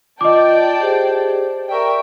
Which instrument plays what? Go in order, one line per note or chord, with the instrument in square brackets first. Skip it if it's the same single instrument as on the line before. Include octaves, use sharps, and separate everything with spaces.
[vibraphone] F4 [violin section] D5 G5 A5 [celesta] D#5 D6
[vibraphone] G4 G#4 C5
[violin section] A#4 E5 G5 [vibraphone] D5 C#6